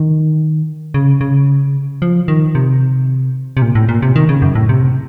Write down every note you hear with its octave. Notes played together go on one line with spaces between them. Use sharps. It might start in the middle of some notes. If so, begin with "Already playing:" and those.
Already playing: D#3
C#3
C#3
F3
D#3
C3
C3
A#2
A2
A#2
C3
D#3
C#3
F#2
A2
C3